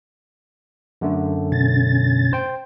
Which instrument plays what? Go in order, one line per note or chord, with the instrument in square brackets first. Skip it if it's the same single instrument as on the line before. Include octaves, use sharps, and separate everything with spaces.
[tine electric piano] F#2 D3 A3
[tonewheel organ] B2 C#4 A6
[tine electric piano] C5 G5